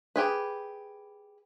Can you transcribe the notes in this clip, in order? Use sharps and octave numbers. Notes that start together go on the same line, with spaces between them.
G4 G#4 B4